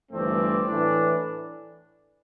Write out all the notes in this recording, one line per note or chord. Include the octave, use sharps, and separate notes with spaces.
G1 G2 E3 A3 C4 D5
A2 E3 A3 D4